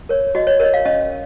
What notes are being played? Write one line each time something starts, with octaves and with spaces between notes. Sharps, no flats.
A#4 C#5
F#4 D#5
C#5
A#4 C#5 D#5
F5
C#4 D#5